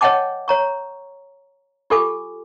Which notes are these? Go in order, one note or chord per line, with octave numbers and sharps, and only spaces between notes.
C#5 D#5 F#5 G5 A5 D6
C#5 A#5 C#6
F4 G4 A4 G#5 D6